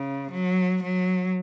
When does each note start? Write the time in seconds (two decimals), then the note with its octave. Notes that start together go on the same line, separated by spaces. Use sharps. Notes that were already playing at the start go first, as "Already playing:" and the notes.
Already playing: C#3
0.32 F#3
0.83 F#3